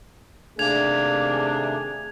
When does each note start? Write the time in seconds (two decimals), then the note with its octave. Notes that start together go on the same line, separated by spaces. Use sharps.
0.59 C3 D#3 A3 A#3 D4 G#4 G#6 F7